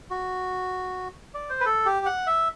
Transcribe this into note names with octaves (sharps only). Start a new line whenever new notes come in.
F#4
D5
C5
B4
A4
G4
F#5
E5